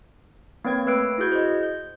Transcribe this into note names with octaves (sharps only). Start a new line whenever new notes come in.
A#3 C4 B4 C#5 G5 G#6
A3 B4 E6 F#6 C7 D7
E4 F#4 G#4 G6 G#6
C5 D#5
G6